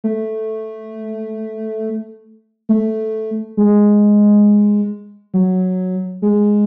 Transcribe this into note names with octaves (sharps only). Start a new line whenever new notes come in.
A3
A3
G#3
F#3
G#3